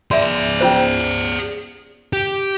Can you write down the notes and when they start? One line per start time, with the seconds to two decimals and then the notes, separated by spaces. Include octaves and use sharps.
0.11 G#4 D5 E5 C6
0.61 C#4 F4 C5
2.13 G4